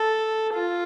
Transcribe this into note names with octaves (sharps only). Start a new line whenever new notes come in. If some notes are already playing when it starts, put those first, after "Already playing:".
Already playing: A4
F4